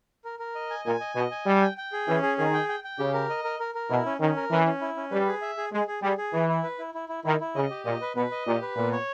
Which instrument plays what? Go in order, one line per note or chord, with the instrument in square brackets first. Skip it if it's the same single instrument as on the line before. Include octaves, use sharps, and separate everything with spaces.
[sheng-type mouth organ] A#4
A#4
D#5
G#5
[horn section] A#2 [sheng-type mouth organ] G#5
[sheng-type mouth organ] D#5
[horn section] B2 [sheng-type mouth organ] D#5
[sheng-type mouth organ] G#5
[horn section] G3 [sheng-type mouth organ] G5
[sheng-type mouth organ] G5
G5
G#4
[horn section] E3 [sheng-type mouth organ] C#4
[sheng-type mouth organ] G#4
[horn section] D#3 [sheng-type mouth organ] G#4
[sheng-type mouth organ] G5
G5
G5
[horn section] C#3 [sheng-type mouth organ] G4
[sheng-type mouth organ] A#4
D#5
A#4
A#4
A#4
[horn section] B2 [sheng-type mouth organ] E4
[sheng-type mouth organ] C#4
[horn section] D#3 [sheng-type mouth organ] C#4
[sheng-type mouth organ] A#4
[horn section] E3 [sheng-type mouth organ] C#4
[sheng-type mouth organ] C#4
E4
C#4
[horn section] G3 [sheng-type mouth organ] B4
[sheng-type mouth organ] G#4
E5
G#4
[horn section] G#3 [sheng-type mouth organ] G#4
[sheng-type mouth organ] G#4
[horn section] G3 [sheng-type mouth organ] G#4
[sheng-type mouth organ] G#4
[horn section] E3 [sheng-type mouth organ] E4
[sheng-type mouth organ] E4
B4
E4
E4
E4
[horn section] D#3 [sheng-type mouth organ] E4
[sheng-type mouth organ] E4
[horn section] C#3 [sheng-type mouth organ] D#5
[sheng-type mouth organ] G4
[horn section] A#2 [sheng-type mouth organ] D#5
[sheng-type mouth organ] B4
[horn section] B2 [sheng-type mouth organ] B4
[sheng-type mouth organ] D#5
[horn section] A#2 [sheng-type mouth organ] G4
[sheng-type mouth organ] B4
[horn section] A#2 [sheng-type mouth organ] B3
[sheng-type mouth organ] C#5